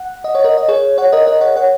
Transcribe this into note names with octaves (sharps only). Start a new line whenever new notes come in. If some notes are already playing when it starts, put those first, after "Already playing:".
Already playing: F#5
D#5
C#5
A#4 D#5
D#5
G#4 C#5
C#5 F#5
A#4 D#5
A#4 D#5
C#5 F#5
C#5 F#5